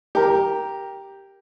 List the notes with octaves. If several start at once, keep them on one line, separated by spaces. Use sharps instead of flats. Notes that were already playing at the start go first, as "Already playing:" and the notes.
G4 A#4